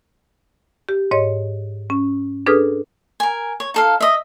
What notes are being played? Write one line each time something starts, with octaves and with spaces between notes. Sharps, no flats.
G4
G#2 C#5 D#5
C#4
D4 G#4 A4 B4 D#6 F6
A#4 G#5
C#5
D#4 A4 F5
D#5 E5